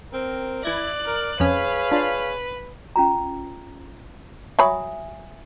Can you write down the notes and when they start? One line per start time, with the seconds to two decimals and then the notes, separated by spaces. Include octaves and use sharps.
0.12 C4 A#4
0.63 E3 E4 D5 F#6 G#6 A#6
1.05 A#4
1.40 F2 C#4 G#4 B4 C#5 F5
1.92 D4 F4
2.96 C#4 F4 A#5
4.59 F#3 C#5 E5 G#5 B5 D#6